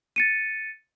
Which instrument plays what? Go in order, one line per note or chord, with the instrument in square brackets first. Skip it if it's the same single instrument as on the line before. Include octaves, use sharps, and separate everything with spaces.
[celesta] A6 C#7 D#7